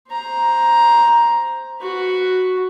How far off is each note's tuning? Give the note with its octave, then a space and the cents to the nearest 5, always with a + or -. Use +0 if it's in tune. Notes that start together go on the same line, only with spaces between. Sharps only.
C5 +0 A#5 +10
F#4 +0 B4 +0